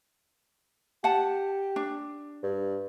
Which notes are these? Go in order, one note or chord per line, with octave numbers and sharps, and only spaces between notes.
G4 F#5 A5
D4
G2